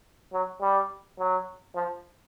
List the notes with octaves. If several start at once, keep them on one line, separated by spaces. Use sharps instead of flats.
F#3
G3
F#3
F3